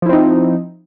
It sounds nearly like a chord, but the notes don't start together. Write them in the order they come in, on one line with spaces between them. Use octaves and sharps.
F3 E4 C4 D#4